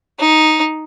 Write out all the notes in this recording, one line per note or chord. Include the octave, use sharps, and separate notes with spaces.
D#4